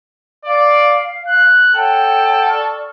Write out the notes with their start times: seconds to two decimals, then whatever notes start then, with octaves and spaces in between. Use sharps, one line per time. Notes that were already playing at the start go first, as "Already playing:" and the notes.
0.45 D5 F5
1.27 F#6
1.75 A4 C#5 F#5 G5
2.48 D5 C#6 F6